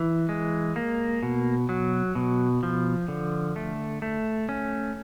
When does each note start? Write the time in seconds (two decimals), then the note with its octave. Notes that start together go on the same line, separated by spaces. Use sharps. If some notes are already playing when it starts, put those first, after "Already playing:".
Already playing: E3
0.29 G#3
0.76 A#3
1.23 B2
1.69 F#3
2.15 B2
2.63 F3
3.08 D3
3.56 A3
4.02 A3
4.49 C#4